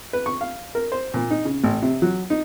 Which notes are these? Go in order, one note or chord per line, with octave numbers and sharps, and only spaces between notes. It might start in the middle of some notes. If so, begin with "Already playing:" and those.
B4
C#6
F5
A#4
C5
A#2
D#4
C#3
A1
C3
F#3
D#4